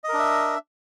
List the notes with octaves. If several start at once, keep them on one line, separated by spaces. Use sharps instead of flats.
D4 A#4 D#5 E5